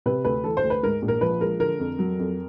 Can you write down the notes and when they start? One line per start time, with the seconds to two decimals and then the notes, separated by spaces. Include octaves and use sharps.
0.06 C3 B4
0.25 D2 B4
0.44 E3 A4
0.57 C5
0.63 D2
0.70 B4
0.83 G#2 A#4
1.02 A#1
1.08 A#4
1.21 F3 B4
1.41 G#3 A#4
1.60 D3 A#4
1.80 F2
1.99 F#3
2.19 F2